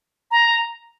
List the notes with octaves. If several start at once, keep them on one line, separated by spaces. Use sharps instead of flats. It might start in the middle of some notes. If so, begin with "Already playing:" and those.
A#5